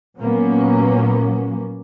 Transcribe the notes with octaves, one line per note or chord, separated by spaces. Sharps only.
A#2 F#3 A#3 B3 C#4